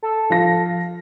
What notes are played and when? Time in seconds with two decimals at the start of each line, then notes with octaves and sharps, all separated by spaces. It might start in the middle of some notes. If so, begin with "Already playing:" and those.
0.03 A4
0.30 F3 F5 A#6